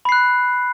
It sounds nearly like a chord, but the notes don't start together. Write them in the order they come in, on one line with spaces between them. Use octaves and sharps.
B5 C7 F#6